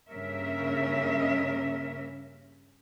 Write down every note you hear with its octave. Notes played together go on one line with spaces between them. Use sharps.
G2 C#3 A#3 C#4 A#4 E5